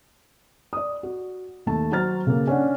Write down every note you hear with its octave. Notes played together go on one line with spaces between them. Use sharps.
D5 D#6
F#4
D#2 A3 A5
F#3 F#4 C5 A#5 F6 A6
C#3 A#3
C#4 D4 F#5